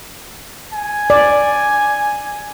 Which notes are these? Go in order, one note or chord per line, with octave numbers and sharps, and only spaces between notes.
G#5
D5